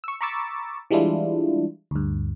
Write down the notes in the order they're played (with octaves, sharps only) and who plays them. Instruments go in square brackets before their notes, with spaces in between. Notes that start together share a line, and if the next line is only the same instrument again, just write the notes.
[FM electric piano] C#6 E6
A#5 B5 C#6 D6 E6 A6
E3 G3 G#3 D4 E4 F4
D2 G2